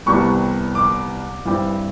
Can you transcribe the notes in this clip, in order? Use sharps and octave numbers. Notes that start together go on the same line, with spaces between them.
C2 C3 E3 G3 B3 C#6
D6
G2 E3 G3 C4